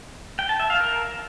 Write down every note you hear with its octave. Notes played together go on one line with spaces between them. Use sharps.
G5
A5
E5
F5
A#4